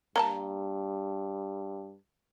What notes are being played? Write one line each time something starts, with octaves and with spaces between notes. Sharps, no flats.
G2 A#3 D5 A5 A#5